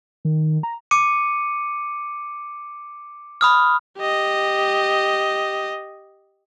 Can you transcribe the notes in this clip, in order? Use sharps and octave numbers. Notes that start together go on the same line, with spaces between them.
D#3
A#5
D6 C#7 D#7
B5 D#6 F6
G4 D#5